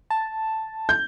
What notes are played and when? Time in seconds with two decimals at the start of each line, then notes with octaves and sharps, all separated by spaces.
0.11 A5
0.89 G6